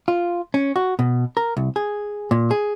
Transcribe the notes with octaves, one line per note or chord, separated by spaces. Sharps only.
F4
C#4
F#4
B2
A#4
C2
G#4
A#2
G#4